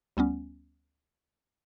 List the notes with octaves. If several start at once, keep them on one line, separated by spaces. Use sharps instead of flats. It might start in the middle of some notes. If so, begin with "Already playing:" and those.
D2 G3 B3 C#4